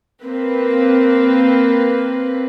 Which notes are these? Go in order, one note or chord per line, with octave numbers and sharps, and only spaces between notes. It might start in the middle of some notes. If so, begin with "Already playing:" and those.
A#3 C4 B4